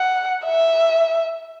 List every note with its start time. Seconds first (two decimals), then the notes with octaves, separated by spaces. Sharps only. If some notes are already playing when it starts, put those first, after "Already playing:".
Already playing: F#5
0.44 E5